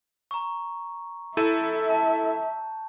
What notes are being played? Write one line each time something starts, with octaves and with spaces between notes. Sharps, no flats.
A#5 C#6
E4 A4 E5 G6 D#7
A5